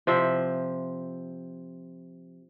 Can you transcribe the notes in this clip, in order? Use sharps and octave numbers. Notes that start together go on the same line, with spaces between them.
C3 F3 E5